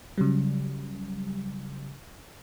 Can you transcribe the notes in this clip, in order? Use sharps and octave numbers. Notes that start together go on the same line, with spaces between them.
C#3 F#3 G3